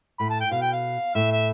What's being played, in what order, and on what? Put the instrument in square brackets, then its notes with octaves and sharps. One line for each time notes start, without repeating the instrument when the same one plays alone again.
[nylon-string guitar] A2 [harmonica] B5
[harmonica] A5
G5
[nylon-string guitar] B2 [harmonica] F5
[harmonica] G5
F5
[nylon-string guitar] A2 [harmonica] E5
[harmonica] E5